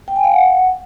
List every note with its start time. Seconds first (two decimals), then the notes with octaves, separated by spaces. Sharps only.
0.08 G5
0.16 G#5
0.24 F5
0.32 F#5